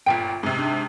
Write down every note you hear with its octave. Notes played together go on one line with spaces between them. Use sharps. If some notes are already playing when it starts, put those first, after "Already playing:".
G1 A#2 E5 G5 D7
G#2 C3
D4